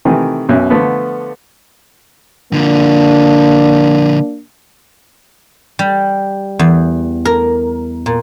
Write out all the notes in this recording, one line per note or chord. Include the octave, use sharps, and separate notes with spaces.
C3 D#3 E3 A3
B1 F#2 B2 E5
D3 F3 A3 B3
D3 F3 A#3 D4
G3
E2
A#4
A#2